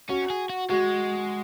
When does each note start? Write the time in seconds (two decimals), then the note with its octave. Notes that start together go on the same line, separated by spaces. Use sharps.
0.09 C#4 F#4
0.30 G#4
0.50 F#4
0.70 G#3 F#4